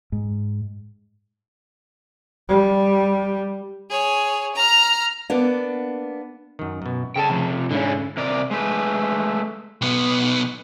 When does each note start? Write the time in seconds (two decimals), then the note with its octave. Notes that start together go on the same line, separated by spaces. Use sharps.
0.12 G#2
2.48 G3
3.90 G#4 C#5
4.55 A#5 F6
5.30 A#3 B3 D4
6.59 F#2 D#3
6.82 F#2 B2
7.16 C#3 A4 G5 A5
7.30 C3 F3
7.71 G#2 D3 C#4 E4
8.17 C3 A#4 D5
8.51 G#3 A3 B4
9.82 B1 B3